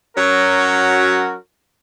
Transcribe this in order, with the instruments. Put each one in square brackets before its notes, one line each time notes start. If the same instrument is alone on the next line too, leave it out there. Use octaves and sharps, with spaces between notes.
[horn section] F#3 C#4 F#4 A#4